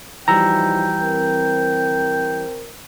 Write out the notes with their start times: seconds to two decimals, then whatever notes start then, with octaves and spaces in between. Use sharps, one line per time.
0.28 E3 F3 G3 D#4 F#4 G5 A#5 E6
1.02 C4 A#4